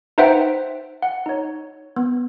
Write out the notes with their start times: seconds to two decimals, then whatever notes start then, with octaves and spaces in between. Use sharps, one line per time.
0.18 D#4 B4 C5 E5 F#5 G5
1.02 F#5
1.26 D#4 C#5
1.96 B3